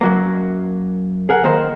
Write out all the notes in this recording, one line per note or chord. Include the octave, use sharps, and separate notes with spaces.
F#2 F#3 A#3
G#4 A#4 F#5
D#3 A#3 A#4 C5